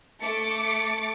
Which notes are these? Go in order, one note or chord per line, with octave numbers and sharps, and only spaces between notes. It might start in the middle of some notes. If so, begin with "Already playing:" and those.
A3 D6 A6 C#7